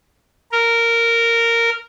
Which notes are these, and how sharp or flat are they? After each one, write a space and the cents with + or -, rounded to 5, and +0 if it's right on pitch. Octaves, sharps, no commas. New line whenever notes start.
A#4 -10